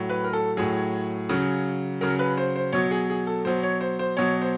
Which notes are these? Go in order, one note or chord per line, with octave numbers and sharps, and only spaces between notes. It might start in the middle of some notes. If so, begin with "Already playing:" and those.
Already playing: A2 F#3
B4
A#4
A4
A2 F#3 G#4
C#3 F#3
C#3 F#3 A#4
B4
C5
C5
B2 F#3 C#5
G#4
G#4
A4
B2 F#3 C5
C#5
C5
C5
B2 F#3 C#5
C5